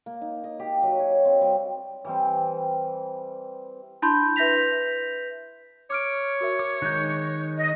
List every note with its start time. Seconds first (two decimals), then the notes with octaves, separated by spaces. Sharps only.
0.06 A#3
0.21 D#4
0.44 D#5
0.59 G4
0.83 F#3
0.99 C#5
1.25 C4
1.41 G3
2.05 E3 G3 C4
4.02 D4 E4 A5 B5 C6 G6
4.36 B4 E5 G6 A#6 B6 F7
5.90 C#5 D6 F6 D7
6.41 F#4 A#4 E5
6.59 D6
6.82 D#3 G#3 D#4 F#6 G6
7.56 D#5